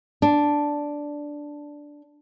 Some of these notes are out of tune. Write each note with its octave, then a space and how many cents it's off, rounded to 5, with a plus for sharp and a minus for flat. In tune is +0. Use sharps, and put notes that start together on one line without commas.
D4 -5